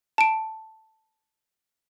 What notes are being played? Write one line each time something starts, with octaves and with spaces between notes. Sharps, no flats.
A5 D7